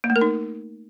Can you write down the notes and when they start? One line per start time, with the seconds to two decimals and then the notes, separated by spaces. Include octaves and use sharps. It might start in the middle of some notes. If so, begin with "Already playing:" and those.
0.04 A#3
0.10 A3
0.16 A#4
0.21 D#4